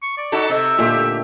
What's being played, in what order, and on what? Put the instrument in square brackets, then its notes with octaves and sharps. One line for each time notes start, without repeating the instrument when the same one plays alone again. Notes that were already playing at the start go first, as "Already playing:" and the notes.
[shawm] C#6
D5
[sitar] D#4 F#4 A4
[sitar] C3 [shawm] E5
[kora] A#2 D3 A3 [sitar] G4